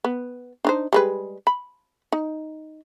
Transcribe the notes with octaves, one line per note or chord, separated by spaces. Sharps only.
B3
D4 D#4 C5
G3 G#3 B4
B5
D#4